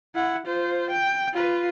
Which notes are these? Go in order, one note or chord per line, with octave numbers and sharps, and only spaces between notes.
E4 F#5
F4 C5
G5
F4 B4